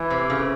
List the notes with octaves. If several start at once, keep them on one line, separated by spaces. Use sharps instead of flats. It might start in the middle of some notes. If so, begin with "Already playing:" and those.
Already playing: E3
C3
C#3